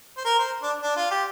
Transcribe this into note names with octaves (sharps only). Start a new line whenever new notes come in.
C5
A#4
C5
D4
D4
F4
G4